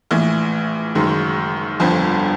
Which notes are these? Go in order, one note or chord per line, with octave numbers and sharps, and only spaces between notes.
A#1 A2 E3
F#1 F#2 D#3 G#3
G1 F2 D3 F3